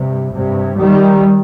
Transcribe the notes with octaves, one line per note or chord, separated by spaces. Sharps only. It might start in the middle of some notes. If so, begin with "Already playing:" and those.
Already playing: G2 C3
G2 C3
D#3 G3